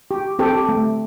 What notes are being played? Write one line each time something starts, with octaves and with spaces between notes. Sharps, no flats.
G4
C4 G4 A4
A3